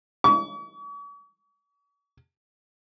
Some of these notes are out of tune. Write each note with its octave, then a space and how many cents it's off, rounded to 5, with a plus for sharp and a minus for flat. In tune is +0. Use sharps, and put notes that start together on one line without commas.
C#6 +45